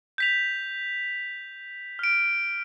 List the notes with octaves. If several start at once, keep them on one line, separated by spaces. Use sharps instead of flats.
G6 B6 F7
F6 D7